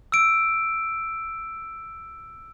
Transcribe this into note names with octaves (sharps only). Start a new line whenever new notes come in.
E6 D7